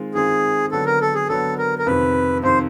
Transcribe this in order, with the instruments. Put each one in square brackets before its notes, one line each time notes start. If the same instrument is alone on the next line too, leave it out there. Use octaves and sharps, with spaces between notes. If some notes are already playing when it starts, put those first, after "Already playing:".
Already playing: [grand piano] D#3 G#3 C4 F4
[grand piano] D#3 G#3 C4 F4 [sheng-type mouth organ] G#4
[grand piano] D3 F#3 B3 [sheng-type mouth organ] A4
[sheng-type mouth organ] A#4
A4
G#4
[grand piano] D3 F#3 B3 [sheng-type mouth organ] A4
[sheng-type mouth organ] A#4
A#4
[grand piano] F2 C3 D#3 [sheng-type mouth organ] B4
[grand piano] F2 C3 D#3 [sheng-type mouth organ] C5